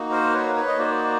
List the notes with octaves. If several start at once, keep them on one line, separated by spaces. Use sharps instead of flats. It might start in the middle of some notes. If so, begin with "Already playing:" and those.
Already playing: A#3 D#4 F#4
A#4 C5
B4 C#5
B4 C#5
D#5
A#3 D#4 F#4 C5 D5